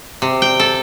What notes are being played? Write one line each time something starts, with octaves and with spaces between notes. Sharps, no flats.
C3
G5
A4